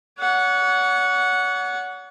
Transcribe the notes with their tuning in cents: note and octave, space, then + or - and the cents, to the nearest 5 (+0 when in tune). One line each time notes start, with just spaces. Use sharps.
C#5 +40 F#5 -10